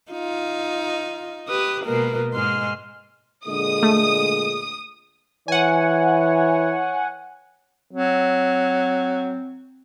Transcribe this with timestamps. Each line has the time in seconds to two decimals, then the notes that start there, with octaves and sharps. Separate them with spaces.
0.12 D#4 F4
1.48 G4 B4 D#6
1.85 B2 G#3 A#3 A#4 B4
2.33 G#2 G#3 C6 F6
3.47 A#2 D3 G#3 D#6
3.83 A3
5.48 E3 C#5 F#5 G#5
7.91 F#3 C4